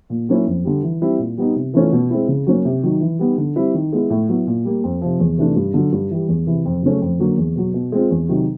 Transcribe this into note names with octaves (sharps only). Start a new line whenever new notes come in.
A#2
F#3 A#3 C#4 E4
F2
D3 G3
E3
G3 C4 E4
A#2
G3 B3 D#4
C3
E3 A3 C#4 F4
B2
G#3 C4 E4
C#3
F#3 A#3 C#4
C3
D#3 F#3
E3
G3 B3 D#4
D3
G3 C4 E4
D#3
G#3 B3 E4
A2
F#3 B3 E4
A#2
G3 A#3
F2
C3 F3
E2
C3 E3 A3 D4
G2
D3 F#3
G2
E3 G3
E2
C3 E3
F2
C#3 F#3 A3 C#4
F2
D3 F#3 A#3
E2
B2 F#3 B3
B2
G#3 C4 F4
E2
C3 D#3 F#3